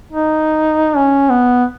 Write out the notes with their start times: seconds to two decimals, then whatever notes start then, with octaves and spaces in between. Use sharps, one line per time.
0.13 D#4
0.96 C#4
1.30 B3